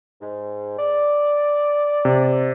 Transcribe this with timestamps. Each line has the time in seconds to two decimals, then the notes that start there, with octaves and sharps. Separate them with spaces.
0.21 G#2
0.78 D5
2.05 C3